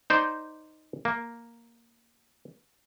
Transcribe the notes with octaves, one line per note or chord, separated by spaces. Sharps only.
D#4 C5 D5
A#3